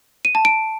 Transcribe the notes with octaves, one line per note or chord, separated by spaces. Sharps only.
D#7
A5
D7